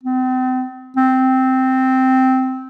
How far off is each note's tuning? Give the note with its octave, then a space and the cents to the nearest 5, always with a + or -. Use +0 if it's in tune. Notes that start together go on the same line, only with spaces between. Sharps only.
C4 -40
C4 -10